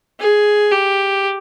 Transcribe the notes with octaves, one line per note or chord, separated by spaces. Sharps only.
G#4
G4